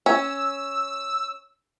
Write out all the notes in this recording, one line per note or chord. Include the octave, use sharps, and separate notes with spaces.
C#4 E6